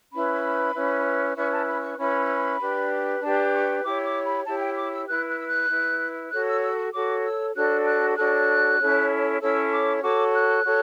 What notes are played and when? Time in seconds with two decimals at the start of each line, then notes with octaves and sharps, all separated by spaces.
0.13 C#4 E4 B4 B5
0.75 C#4 E4 B4
1.36 C#4 E4 B4 C#6
1.52 A5
1.67 B5
1.83 C#6
1.98 C#4 E4 B4 B5
2.60 D4 G4 B4
3.22 D4 G4 B4 A5
3.53 C#6
3.84 E4 G4 C#5 D6
4.05 D6
4.25 B5
4.45 E4 G4 C#5 A5
4.61 G5
4.77 D6
4.92 E6
5.08 E4 B4 F#6
5.28 F#6
5.39 E6
5.48 F#6
5.69 E4 B4
6.31 F#4 A4 C#5 F#6
6.47 E6
6.63 E6
6.78 C#6
6.93 F#4 A4 C#5 D6
7.25 E6
7.55 D4 F#4 A4 C#5 F#6
7.86 F#6
8.17 D4 F#4 A4 C#5 F#6
8.79 C#4 E4 A4 C#5
9.40 C#4 E4 A4 C#5 E6
9.72 D6
10.03 F#4 A4 C#5 D6
10.33 F#6
10.64 F#4 A4 C#5